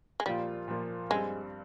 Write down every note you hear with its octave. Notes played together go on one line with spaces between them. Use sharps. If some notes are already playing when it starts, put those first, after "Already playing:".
G#3
A#2 F3 G3 A#3 F4
A#2 F3 A#3 F4
G2 G3 G#3 C4